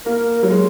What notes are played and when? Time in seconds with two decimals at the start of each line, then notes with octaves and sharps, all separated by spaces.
0.06 A#3 A#4
0.43 F#3
0.50 G#3